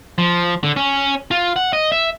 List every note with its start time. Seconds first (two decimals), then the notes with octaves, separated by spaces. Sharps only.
0.18 F3
0.63 D3
0.76 C#4
1.31 F4
1.56 F#5
1.73 D#5
1.92 E5